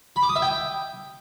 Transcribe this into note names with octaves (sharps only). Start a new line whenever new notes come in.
B5
D6
D#6
E5
G5